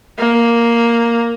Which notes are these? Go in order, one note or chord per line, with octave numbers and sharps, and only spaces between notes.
A#3